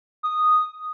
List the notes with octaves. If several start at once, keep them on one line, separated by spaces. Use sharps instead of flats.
D#6